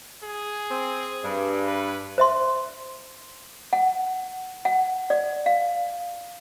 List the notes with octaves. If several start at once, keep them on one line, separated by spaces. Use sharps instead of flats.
G#4
C4
G2
B4
C5 E5 C6
F#5
F#5
D5
F5